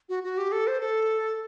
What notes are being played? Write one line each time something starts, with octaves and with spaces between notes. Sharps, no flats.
F#4
F#4
G4
A4
C5
A4